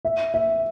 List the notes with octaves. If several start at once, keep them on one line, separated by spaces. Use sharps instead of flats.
E5
E5